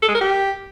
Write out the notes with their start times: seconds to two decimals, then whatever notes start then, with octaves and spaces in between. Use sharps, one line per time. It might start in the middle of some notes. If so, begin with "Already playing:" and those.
0.02 A4
0.08 G#3
0.15 A#4
0.21 G4